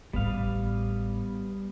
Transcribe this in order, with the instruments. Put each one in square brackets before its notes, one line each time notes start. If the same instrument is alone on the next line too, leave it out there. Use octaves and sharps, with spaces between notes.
[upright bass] A1 A2 [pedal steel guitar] G3 B3 F5